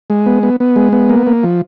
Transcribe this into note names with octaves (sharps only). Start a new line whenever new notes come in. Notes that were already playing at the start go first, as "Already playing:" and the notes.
G#3
B3
B3
B3
G#3
B3
A#3
A#3
F3